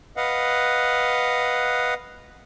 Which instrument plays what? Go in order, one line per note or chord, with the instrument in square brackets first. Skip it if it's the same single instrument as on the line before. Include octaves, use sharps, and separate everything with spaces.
[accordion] B4 D#5 F5 F#5